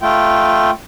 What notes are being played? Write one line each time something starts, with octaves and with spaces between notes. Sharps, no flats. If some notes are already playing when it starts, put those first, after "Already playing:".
A3 F4 G5